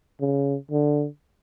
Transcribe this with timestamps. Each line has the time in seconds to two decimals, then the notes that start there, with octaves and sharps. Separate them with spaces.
0.21 C#3
0.71 D3